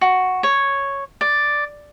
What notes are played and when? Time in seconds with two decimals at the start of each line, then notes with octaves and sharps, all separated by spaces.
0.01 F#4
0.43 C#5
1.21 D5